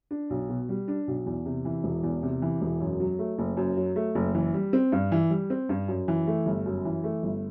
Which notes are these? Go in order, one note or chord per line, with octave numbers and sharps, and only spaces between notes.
D4
B1
B2
G3
D4
B1
E2
C3
E3
E1
E2
C3
E3
E1
F#2
F#3
A3
F#1
F#2
F#3
A3
F#1
E3
G3
C4
G2
E3
G3
C4
G2
F#2
E3
A3
G1
F#2
E3
A3
G1